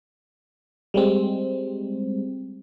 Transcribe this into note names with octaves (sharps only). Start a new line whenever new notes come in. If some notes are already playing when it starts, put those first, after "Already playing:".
G3 G#3 C4